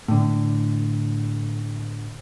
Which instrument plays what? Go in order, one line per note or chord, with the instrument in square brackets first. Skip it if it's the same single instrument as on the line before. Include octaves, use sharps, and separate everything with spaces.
[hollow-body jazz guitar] A2 D3